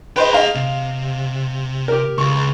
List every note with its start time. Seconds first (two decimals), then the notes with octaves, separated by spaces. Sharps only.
0.16 G#4 B4 C5 D#5 G5
0.33 D#5 F5 A#5
0.55 C3
1.88 G4 A#4
2.18 C#2 C#6